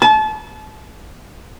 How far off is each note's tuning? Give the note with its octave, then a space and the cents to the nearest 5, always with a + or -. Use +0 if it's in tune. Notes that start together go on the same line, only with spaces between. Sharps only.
A5 -30